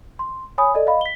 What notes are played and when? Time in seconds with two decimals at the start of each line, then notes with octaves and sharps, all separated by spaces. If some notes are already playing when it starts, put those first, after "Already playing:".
0.19 C6
0.58 C#5 G#5 B5 D#6
0.74 A4 D5 D#5
0.87 D#5 F5 B5
1.01 B6 G7